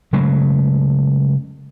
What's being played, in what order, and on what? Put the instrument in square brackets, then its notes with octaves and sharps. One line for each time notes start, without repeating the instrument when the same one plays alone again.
[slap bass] C#3 F#3 G#3 A3